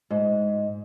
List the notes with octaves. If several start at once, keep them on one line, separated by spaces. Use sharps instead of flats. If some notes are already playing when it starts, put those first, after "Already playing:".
G#2